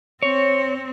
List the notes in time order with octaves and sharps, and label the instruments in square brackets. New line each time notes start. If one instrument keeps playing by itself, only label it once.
[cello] C4 [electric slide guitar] C#5